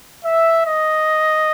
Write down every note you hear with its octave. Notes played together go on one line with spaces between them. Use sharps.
E5
D#5